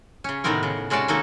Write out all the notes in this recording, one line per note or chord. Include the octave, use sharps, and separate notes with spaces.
C#3 C#4
A2 C3 D#3 B3 C4 A#4
C#3
C3 G#3 C#4 F#4 D5 A5
D#3 A3 A#3 F#4 A4